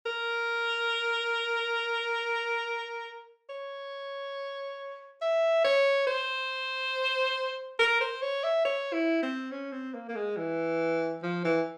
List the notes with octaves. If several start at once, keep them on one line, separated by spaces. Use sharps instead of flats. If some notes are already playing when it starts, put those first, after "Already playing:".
A#4
C#5
E5
C#5
C5
A#4
C5
C#5
E5
C#5
E4
C4
C#4
C4
A#3
A#3
G#3
E3
F3
E3